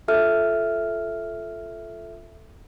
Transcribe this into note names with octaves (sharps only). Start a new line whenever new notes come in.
F4 A4 E5 F6